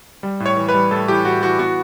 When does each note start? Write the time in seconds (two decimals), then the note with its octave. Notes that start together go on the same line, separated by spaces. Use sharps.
0.23 G3
0.40 A2
0.46 C#5
0.57 E3
0.69 B4
0.74 G3
0.91 A2 A4
1.08 E3 G4
1.25 A2 F#4
1.42 E3 F#4
1.59 B3 F#4